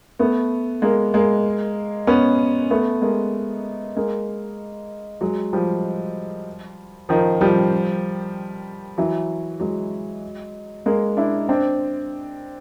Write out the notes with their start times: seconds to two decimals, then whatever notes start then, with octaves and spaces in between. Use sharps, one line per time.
0.19 A3 B3
0.82 G#3 A#3
1.14 G#3 A#3
2.07 B3 C#4
2.70 A3 B3
3.02 G#3 A#3
3.96 G#3 A#3
5.21 F#3 G#3
5.53 F3 G3
7.09 D#3 F3
7.41 F3 G3
8.98 E3 F#3
9.60 F#3 G#3
10.86 G#3 A#3
11.17 D4 E4
11.49 C4 D4